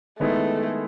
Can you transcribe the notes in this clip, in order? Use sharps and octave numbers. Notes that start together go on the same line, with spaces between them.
D#3 G#3 A3 B3 E4